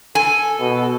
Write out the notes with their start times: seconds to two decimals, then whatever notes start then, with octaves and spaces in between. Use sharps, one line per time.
0.15 A4 G#5
0.60 B2